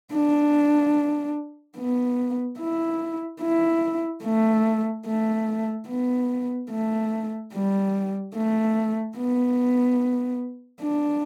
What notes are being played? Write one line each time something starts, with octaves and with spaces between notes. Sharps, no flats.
D4
B3
E4
E4
A3
A3
B3
A3
G3
A3
B3
D4